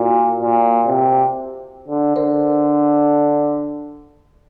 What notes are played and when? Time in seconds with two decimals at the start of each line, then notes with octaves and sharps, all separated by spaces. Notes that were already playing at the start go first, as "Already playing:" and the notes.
Already playing: A#2 E4 F#4
0.42 A#2
0.86 C3
1.88 D3
2.16 D3 A#4 C5